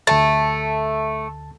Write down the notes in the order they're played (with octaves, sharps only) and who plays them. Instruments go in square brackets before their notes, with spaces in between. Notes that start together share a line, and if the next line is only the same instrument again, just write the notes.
[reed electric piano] D2 A5 A6 [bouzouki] A3